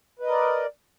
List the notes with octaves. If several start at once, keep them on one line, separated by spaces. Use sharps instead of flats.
A#4 B4 D5 D#5